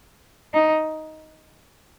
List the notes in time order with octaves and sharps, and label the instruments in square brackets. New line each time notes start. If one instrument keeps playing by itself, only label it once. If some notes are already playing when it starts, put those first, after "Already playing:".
[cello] D#4